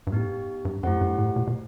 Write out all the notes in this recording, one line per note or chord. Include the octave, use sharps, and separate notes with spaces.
G2
A2 B3 D#4 G4
G2
F#2 A3 E4 G4 C5 F#5
G2
A2
B2
B2